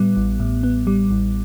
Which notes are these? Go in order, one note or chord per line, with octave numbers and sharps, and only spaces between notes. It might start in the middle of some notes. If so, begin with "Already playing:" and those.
Already playing: A2 G3 B3
A1
A2
B3
G3
A1